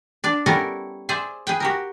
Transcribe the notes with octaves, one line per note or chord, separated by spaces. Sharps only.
D4 D5
G3 B3 C#4 E4 A4 A#4
G#4 C5 D5 E5
G#4 B4 G5
F#4 G4 A#4